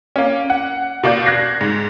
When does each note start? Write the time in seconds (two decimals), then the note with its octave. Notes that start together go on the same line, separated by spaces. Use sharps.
0.16 A#3 C#4
0.50 F#5
1.03 B2 A#3 D5 G6
1.26 F#6 G#6 A#6 C7
1.61 G#2